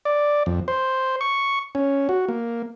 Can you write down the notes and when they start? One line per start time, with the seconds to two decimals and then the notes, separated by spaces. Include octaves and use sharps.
0.05 D5
0.46 F2
0.68 C5
1.21 C#6
1.75 C#4
2.09 F#4
2.29 A#3